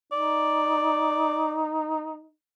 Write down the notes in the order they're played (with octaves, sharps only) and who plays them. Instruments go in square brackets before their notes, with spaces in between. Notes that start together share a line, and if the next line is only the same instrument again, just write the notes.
[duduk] D#4 [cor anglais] D5